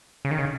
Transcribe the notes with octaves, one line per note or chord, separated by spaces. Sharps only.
C#3
D#3
C#3